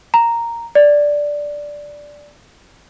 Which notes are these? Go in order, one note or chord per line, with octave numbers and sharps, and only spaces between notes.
A#5
D5